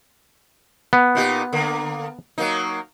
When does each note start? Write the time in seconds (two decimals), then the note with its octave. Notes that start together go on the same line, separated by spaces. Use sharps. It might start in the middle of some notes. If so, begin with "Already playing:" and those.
0.93 B3
1.15 A#2 D#4 G4
1.53 D3 A#3
2.38 F#3 A#3 D#4